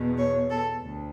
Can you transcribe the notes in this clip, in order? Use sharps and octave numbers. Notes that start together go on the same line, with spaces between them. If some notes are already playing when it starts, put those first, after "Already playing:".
Already playing: E2 B2
C#5
A4
D2